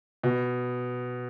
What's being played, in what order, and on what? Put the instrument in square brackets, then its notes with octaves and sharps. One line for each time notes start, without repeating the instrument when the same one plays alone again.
[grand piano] B2